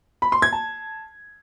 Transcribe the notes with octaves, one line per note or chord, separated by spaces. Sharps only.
B5
C6
G#6
A5